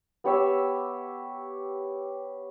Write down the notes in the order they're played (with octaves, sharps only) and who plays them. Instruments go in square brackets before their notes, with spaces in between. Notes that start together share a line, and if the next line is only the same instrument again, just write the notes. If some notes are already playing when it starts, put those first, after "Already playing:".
[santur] B3 G4 C#5 E5